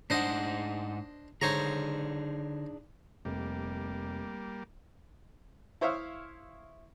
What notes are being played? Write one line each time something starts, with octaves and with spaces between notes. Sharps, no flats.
G#2 D4 D#4 C5 D#5 F#5
D3 D4 D#4 G#4 C5 C#5 A#5
F1 G3 A#3
E4 C5 C#5 E5 F5 D#6